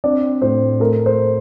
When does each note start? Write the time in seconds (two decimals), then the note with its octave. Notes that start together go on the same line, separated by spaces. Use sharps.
0.04 C4 D4 D5
0.42 A2 C5
0.80 A3 A#4
1.06 C5